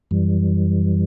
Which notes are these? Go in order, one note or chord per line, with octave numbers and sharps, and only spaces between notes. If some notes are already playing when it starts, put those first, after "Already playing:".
F#2 E3 G3